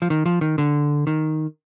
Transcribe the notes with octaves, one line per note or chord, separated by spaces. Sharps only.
F3
D#3
F3
D#3
D3
D#3